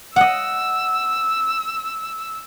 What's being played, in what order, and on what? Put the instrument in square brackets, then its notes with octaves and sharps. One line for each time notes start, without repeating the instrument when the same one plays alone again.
[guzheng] D#5 F#5 [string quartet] E6